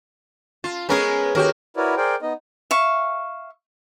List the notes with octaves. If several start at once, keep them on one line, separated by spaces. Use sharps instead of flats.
F4 A5
G#3 B3 C#4 G#4 A#4 B4
D#2 F#4 G4 A#4
E4 F#4 A#4 B4 C#5 D5
G#4 A#4 C5 D5 G5
B3 D#4 D#5
E5 F5 C#6